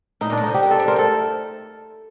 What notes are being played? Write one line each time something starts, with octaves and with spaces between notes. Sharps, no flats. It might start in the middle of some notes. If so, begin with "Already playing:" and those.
A2 D#4
A#2
A2 D4
C3 D#4
D3 G4
D#3
C4 A4
D4
C4 A#4
A3
A4